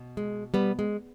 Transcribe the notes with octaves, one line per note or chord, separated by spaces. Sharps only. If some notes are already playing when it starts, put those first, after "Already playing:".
Already playing: B2
G#3
G3 B3
G#3